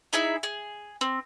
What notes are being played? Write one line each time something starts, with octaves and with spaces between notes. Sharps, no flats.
D#4 E4 G#4 E5
G#4
C4